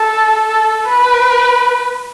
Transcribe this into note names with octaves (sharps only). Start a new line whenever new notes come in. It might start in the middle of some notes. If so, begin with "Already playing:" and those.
Already playing: A4
A4
B4